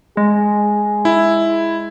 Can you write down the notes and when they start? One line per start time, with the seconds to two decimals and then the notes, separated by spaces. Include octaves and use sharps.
0.17 G#3 G#4
1.05 E4